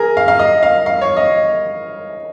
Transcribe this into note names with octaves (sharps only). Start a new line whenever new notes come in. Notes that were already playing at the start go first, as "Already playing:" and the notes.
Already playing: G#4 A#4
F5
F5
D#5
F5
F5
C#5
D#5